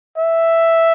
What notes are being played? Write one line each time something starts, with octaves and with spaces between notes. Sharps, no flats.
E5